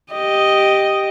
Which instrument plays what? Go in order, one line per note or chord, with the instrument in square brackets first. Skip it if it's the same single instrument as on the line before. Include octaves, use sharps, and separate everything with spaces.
[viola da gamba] G4 D#5